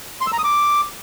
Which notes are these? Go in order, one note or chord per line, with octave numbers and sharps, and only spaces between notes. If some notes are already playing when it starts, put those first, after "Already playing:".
C6
E6
A#5
D#6
D6